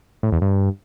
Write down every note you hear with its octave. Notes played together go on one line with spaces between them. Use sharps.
A2
E2
G2